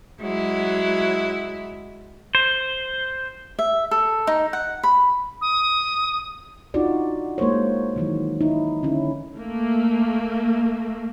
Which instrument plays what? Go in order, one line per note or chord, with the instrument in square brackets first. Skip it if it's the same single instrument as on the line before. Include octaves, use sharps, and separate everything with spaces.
[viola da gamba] F#3 G#3 E4
[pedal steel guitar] C5
[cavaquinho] E5
A4
D#4
F#5
B5
[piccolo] D#6
[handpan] D4 D#4 F4 F#4 D5
G#3 A#3 D#4 C5 C#5
D#3 E3 F#3
D#4 E4
D3 C#4 E4
[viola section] A3 A#3